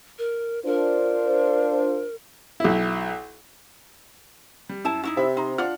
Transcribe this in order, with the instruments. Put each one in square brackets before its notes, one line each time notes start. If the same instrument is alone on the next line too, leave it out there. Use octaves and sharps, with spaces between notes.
[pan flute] A#4
[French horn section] D4 F4 C5 [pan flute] A#4
[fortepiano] B1 E4
[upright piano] G3
[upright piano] F#2 [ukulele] E4 A5
[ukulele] D#4 E4 F#4
[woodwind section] C3 [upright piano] E5 B5
[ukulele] D#4 [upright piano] A#5 C6
[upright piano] D4 F#5 F6 [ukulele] F4